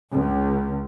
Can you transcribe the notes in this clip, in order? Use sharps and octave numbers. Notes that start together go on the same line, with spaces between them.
C#2